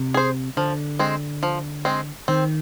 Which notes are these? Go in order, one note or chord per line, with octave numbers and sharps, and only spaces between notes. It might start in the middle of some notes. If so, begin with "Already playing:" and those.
Already playing: C3
G#4 C5
D3 F3
G#3 C4
F3
G#3 C4
D#3 C4